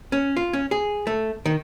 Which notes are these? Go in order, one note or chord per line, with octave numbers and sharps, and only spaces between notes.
C#4
F4
C#4
G#4
A3
D#3